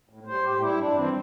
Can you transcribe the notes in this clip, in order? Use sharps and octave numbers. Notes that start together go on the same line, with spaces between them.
A2
G3 C5
A2 G4
G3 E4
G2 D4
E3 G3 C4